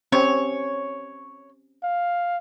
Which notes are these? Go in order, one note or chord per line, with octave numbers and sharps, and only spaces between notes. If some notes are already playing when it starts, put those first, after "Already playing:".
C4 C#4 G4 C#5
F5